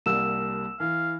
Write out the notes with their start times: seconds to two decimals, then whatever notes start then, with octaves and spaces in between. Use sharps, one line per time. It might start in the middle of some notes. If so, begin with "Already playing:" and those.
0.06 C2 G3 A#3 E6 E7
0.80 E3 F5